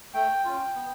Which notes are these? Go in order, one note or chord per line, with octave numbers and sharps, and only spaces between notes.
A3 G5
C#4 F4
B3